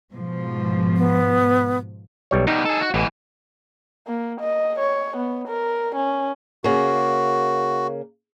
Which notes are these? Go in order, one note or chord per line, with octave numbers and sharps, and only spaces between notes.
G#2 B2 F3
B3
B1 G3 C#5
B2 G3 D#4
G#4 A4
F#4
A1 B2 E3
A#3
D#5
C#5
B3
A#4
C#4
C#3 A#3 F#4